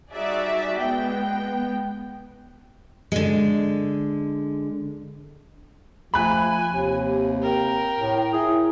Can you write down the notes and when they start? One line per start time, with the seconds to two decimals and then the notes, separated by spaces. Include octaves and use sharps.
0.12 G3 D#4 F#4 G#4 D5 E5
0.79 G#3 B3 G5
3.12 D3 G#3
6.14 F3 A3 G#5 B5 F#6
6.71 D#2 C3
7.42 A#4 G5
7.99 A2
8.33 E4 G#4